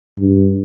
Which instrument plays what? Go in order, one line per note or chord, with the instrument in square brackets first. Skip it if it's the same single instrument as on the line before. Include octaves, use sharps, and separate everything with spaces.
[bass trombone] G2